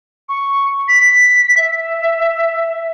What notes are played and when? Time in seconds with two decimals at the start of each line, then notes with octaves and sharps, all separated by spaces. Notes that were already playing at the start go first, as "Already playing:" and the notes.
0.29 C#6
0.88 B6
1.57 E5